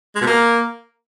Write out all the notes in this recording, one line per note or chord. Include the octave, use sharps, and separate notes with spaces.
G#3
B2
A#3